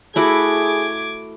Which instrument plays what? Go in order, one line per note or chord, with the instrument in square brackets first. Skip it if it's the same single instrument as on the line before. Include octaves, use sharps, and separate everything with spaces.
[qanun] A3 E4 F#4 [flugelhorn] G#4 [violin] D6 G#6